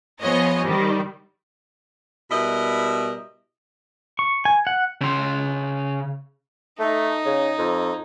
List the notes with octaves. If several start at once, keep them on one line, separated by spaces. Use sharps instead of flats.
F3 B3 G#4 C5 C#5 D#5
D#3 G3
B2 G3 E4 A#4 D#5
C#6
G#5
F#5
C#3 C6
A3 D#4
C#3
F2